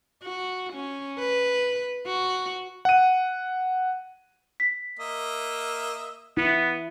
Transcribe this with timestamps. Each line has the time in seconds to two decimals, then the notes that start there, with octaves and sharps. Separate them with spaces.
0.23 F#4
0.73 C#4
1.19 B4
2.06 F#4
2.85 F#5 D#7
4.60 B6
4.99 A#3 D#5 E5
6.37 B3 E4